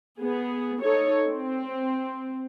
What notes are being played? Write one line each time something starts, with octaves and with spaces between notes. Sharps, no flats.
B3 G#4
D#4 A4 C#5
C4